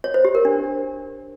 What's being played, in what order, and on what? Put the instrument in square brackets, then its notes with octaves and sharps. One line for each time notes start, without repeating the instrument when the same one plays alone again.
[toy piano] C#5
C5
G4
A#4
D4